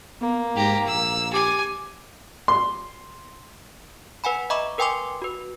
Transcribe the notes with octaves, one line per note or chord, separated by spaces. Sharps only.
A#3 B3
G#2 G4 A#5
A#1 E6
G4 G#5 D6
C6
B4 F#5 G#5 B5
D#5 E5 A#5 B5 C#6 D6
A#4 B4 G5 G#5 C6 D6
F#4 B4